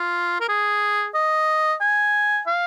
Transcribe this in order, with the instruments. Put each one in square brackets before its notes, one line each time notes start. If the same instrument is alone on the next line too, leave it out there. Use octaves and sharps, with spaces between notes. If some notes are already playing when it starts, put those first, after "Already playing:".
Already playing: [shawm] F4
A#4
G#4
D#5
G#5
F5